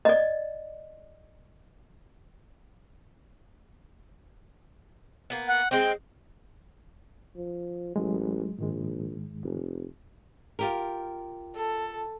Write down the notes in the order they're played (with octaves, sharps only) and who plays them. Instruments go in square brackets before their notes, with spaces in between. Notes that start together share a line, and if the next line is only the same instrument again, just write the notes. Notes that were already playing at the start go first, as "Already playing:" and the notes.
[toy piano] D5 D#5
[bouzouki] A#3 B3
[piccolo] F#5
[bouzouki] G#3 C4 [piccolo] G5
[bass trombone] F3
[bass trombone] A1 [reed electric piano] F#3 G#3
[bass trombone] A#1 [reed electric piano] G#2 D#3 G#3
[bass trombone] F1
[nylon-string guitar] F4 G4 A#4
[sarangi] A4